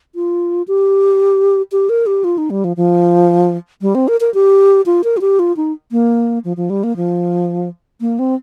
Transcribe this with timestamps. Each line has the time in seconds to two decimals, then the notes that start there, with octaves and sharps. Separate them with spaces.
0.15 F4
0.68 G4
1.72 G4
1.89 A#4
2.07 G4
2.24 F4
2.38 D#4
2.50 G3
2.64 F3
2.77 F3
3.82 G3
3.95 C4
4.08 A#4
4.21 A#4
4.34 G4
4.86 F4
5.04 A#4
5.17 F4
5.21 G4
5.39 F4
5.57 D#4
5.91 A#3
6.44 F3
6.57 F3
6.70 G3
6.84 A#3
6.96 F3
8.01 A#3
8.19 C4